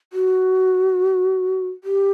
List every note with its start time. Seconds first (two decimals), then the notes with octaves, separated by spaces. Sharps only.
0.13 F#4
1.84 G4